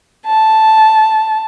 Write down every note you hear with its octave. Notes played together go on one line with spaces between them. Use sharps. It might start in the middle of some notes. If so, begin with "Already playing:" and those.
A5